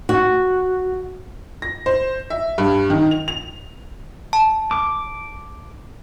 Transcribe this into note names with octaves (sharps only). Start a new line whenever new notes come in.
F#4
A#6
C5
E5
G2
D#3
F7
F7
A5
D6